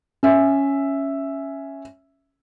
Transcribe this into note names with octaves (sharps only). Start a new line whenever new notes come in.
C#4 E5